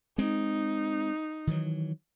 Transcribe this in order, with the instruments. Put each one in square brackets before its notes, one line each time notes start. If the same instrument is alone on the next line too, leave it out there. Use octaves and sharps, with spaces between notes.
[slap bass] G#3 C4 [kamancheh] D#4
[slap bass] D#3 E3 F#3